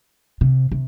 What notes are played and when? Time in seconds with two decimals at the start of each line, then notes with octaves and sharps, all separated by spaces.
0.41 C3
0.72 C3